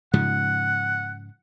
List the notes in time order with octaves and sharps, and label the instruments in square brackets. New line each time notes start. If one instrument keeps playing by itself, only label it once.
[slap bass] G#2 C#3 F3 [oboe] F#5